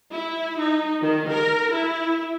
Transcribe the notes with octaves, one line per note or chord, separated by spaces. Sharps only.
E4
D#4
D#3
A#4
E4